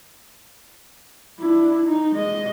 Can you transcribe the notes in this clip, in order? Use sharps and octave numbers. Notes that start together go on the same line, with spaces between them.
D4 E4
D#4
G#3 D#5